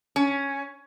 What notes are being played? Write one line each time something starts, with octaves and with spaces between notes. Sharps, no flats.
C#4